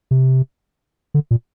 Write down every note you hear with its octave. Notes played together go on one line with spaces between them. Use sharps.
C3
D3
A#2